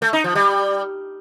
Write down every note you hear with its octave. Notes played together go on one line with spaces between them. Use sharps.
A3
D#4
F3
G3